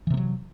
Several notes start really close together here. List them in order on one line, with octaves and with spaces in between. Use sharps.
E3 C3 A#3 F#3